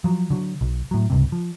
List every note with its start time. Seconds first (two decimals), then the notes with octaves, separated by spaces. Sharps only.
0.04 F3 F#3
0.30 D3 F#3
0.61 B1
0.91 A2 F#3
1.10 C#2 G2 C3
1.32 F3